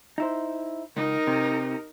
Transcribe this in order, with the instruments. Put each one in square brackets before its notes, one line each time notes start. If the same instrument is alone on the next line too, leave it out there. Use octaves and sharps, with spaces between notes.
[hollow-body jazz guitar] D#4 E4 C5
[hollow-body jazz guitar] C#2 [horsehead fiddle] D#4 A#4
[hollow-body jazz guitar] C3